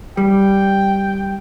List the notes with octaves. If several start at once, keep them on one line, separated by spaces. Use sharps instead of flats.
G3 G5